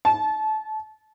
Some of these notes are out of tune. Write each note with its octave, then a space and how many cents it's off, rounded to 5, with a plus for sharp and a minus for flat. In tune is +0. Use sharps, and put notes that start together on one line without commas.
A5 -25